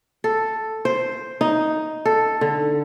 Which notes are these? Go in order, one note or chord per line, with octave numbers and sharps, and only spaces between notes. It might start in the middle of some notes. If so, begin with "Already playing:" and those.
A4
C5
D#4
A4
D3